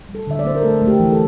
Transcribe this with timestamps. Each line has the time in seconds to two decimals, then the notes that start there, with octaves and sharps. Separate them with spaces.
0.09 G3
0.15 A4
0.27 D3 E5
0.39 D5
0.45 A#3 C5
0.55 A#4
0.63 A3 A4
0.81 A3
0.88 G4
1.00 E3
1.13 A4